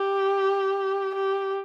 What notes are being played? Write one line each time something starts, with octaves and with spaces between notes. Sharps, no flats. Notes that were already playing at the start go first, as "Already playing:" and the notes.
Already playing: G4
G4